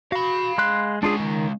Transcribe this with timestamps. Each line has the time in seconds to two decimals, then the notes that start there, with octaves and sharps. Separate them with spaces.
0.12 F#4 F5 B5
0.58 G#3 C6 F#6
1.03 G#3 C#4 D4 F4 G#4
1.20 D#3